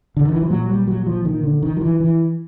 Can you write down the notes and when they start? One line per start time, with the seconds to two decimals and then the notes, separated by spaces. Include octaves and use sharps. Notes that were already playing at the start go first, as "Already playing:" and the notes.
0.17 D3
0.25 D#3
0.33 E3
0.42 F3
0.50 A#2 F#3
0.69 G3
0.88 F#3
1.07 F3
1.25 D#3
1.44 D3
1.63 D#3
1.77 F3
1.81 E3
2.00 E3